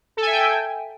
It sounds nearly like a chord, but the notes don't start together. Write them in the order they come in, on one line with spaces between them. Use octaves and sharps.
A4 G#5 E5 G5